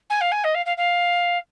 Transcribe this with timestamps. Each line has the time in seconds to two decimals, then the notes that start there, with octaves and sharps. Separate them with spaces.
0.10 G#5
0.21 F5
0.31 G#5
0.44 D#5
0.54 F5
0.65 F5
0.77 F5